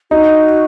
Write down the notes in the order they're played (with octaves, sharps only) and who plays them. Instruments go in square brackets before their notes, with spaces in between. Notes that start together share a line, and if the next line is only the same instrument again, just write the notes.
[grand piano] D#4 [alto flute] F#4